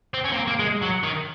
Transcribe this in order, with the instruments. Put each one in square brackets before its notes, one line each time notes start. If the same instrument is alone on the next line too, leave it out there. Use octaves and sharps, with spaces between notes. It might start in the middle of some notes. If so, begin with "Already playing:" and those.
[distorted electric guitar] C4
C#4
A#3
C4
A#3
G#3
F#3
D#3